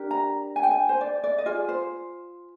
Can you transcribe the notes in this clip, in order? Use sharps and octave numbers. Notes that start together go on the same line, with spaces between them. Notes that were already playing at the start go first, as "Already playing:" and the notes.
Already playing: D4 G4 A#4
A#5
G#5
G5
G#5
C5
D5
D5
D#5
F4 G#4 D5
C5